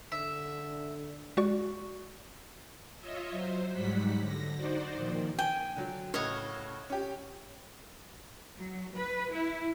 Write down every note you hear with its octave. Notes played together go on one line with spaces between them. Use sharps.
D3 E5
G#3 F#4 D5 C#6
F4 C#5 D#5 E5
F#3 C5
G#2 F#3 G3 F#5 B6
D3 A#6
D#4 F#4 C5 D5
A#2 D#3 F3
G5 G#5
D3 F#3
A2 C#3 C#5 D#5 F#5
C#4 G4
F#3
B4
E4